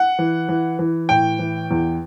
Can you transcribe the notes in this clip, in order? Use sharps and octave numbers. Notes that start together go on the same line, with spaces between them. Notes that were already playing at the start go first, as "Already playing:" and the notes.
Already playing: F#5
E3
E3
E3
A2 G5
E3
E2